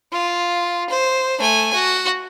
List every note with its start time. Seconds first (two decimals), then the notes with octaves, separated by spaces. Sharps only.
0.12 F4
0.90 C5
1.39 A3 G#5
1.74 F#4